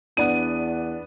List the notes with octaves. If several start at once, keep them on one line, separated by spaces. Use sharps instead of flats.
E2 B3 D4 D#7